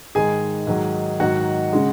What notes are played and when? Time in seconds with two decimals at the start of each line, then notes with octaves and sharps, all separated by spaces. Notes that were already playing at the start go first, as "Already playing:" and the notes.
0.15 G#2 D#3 G#3 G#4 G#5
0.67 G#2 D#3 F#3
1.20 G#2 D#3 F#3 F#4 F#5
1.73 C#3 G#3